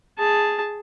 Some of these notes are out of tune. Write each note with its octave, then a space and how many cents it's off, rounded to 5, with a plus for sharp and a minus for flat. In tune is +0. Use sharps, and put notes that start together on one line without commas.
G#4 +0 A5 +0